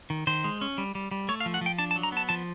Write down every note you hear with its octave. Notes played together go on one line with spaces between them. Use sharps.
D#3
D#3 C5
G#3
C#4
G3
G3
G3
A3 C#5
F5
F3
F#5
F3 G5
D4 A5
A5
F#3
A#5
B3 A5
F3 A5